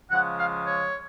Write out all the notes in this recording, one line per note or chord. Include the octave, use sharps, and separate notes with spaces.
C#3 F3 G#3 F#5
F5
C#5